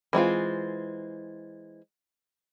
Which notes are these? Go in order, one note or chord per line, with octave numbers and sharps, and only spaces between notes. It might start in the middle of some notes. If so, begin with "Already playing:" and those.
E3 G#3 C4 F4